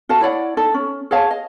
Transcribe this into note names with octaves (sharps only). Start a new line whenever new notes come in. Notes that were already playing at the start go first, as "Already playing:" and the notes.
F#4 A4 F5 A5
E4 C#5 D5 F#5
D#4 A4
C#4
G#4 C#5 F5 A5
D#5